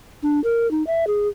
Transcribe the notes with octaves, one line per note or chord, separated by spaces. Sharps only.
D4
A#4
D#4
E5
G#4